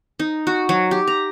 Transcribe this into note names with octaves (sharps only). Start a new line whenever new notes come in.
D#4
F#4
F#3
G4
A#5